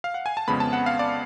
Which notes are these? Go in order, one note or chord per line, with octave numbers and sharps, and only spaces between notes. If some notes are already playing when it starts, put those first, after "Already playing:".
F5
F#5
G#5
A5
F2 C#3 G#3 B3 B5
A5
F#5
F5
D5